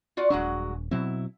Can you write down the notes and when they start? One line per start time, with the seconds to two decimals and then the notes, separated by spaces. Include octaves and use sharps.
0.17 F4 F#4 D5
0.30 D#1 F#3 G#3 D4 F#4
0.91 B2 F#3 C4 E4